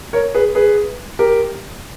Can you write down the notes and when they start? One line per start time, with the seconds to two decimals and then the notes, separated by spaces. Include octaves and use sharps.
0.13 A#4 C#5
0.35 G#4 B4
0.55 G#4 B4
1.19 G4 A#4